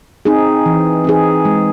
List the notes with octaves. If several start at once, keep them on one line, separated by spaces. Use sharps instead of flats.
C4 D#4 G#4
E3
C4 D#4 G#4
G#3